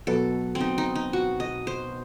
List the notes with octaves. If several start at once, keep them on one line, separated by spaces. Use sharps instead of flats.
B2 F#3 B3 A4
C4
D#4
D#4
D#4
F#4
D#5
C5